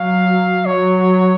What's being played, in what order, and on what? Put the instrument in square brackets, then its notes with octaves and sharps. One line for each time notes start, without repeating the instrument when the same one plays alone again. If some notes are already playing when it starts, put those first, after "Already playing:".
Already playing: [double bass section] F#3 [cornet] F5
[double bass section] F#3 [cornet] C#5